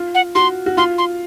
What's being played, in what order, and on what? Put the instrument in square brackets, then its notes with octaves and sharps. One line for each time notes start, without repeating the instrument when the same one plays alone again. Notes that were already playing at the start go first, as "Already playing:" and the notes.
Already playing: [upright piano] F4
[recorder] F#5
[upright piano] F#4 [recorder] C6
[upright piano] F#4
[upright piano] F4 [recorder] C6
[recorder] C6